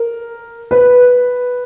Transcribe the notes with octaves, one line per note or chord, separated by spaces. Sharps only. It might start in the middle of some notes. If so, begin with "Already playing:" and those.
Already playing: A#4
B4